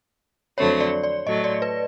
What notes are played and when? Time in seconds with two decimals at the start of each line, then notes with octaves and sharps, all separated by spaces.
0.58 F2 D3 F#3 A3 C4 C#5
0.81 D5
1.03 D5
1.27 A2 F#3 A3 D#5
1.44 D5
1.62 B4